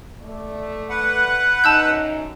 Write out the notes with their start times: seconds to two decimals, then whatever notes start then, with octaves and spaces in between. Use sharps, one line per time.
0.23 A3 D5
0.90 B4 F#5 F#6
1.64 F#2 D#4 A5 E6 G6